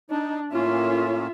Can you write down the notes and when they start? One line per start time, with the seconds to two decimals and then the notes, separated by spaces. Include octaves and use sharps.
0.10 D4 D#4
0.53 A2 A#3 C#4 F4 E5